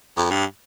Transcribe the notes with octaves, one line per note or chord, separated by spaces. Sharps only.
F2
G2